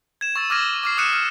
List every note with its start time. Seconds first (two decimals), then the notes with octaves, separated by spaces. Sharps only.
0.21 G#6 E7
0.36 C#6 E6 A6
0.50 D6 E6 F6 G#6 A#6 D#7
0.84 D6 F6 C7
0.97 D#6 F6 F#6 C#7 D#7 E7
1.13 F6